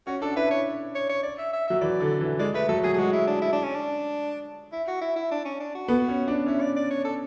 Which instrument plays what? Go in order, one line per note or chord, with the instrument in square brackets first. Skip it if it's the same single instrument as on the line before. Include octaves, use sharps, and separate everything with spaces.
[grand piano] C#4 [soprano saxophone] F#4
[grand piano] D4 [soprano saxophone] A4
[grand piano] E4 [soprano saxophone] B4
[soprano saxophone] C#5
C#5
C#5
D5
E5
E5
[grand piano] F#3 [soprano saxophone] E5
[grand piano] E3 [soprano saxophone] D5
[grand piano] D3
E3
[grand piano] G#3 [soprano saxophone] D5
[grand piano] A3 [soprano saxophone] B4
[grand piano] F#3 [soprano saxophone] A4
[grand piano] F#3 [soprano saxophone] G#4
[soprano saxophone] G#4
[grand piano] G#3 [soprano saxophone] F#4
[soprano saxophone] E4
D4
E4
D4
C#4
D4
E4
F#4
E4
E4
D4
C#4
D4
F#4
[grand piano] B3
C#4
D4
[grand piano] C#4 [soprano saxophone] E4
[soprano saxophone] D5
D5
C#5
A4